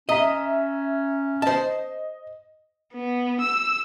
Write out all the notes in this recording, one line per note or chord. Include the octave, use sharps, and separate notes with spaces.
C#4 D#5 E5 A#5 B6
C5 D#5 A5
B3
E6